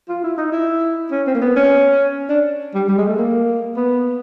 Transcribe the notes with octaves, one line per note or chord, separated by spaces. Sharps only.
F4
E4
D#4
E4
C#4
C4
A#3
B3
C#4
D4
G3
G3
G#3
A3
A#3
B3